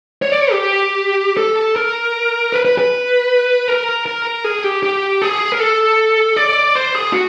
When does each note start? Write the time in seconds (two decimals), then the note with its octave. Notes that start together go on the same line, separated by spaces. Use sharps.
0.22 C#5
0.32 D5
0.41 C#5
0.51 G4
1.37 A4
1.76 A#4
2.52 B4
2.65 B4
2.78 B4
3.68 A#4
4.06 A#4
4.44 G#4
4.64 G4
4.83 G4
5.22 G#4
5.52 A#4
5.60 A4
6.37 D5
6.75 C5
6.95 G#4
7.13 F#4